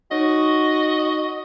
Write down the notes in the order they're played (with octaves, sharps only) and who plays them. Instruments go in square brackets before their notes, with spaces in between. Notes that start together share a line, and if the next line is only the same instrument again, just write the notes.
[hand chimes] D#4 C#5 [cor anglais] F#4 [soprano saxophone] D#5